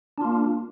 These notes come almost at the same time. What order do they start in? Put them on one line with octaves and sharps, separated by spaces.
D4 F4 A#3